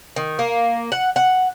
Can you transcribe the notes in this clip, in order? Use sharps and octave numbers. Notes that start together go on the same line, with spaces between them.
D#3
A#3
F#5
F#5